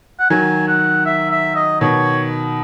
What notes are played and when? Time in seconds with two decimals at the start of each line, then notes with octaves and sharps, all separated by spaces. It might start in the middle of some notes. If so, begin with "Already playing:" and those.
0.19 F#5
0.30 D#3 F#3 G#5
0.68 F#5
1.06 E5
1.31 E5
1.55 D#5
1.81 B2 D#3 C#5